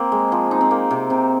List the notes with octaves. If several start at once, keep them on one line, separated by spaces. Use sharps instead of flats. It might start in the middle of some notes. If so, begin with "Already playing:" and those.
Already playing: A#3 C4
G#3
F3
D#4
C4
A#3
C3
C3